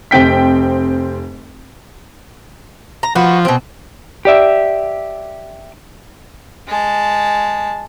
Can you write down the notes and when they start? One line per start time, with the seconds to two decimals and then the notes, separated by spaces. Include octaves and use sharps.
0.11 F1 C4 G5 B6
3.03 A#5
3.15 F3 F#4 B4
3.45 B2 C4
4.25 G4 D5 E5
6.68 G#3 A5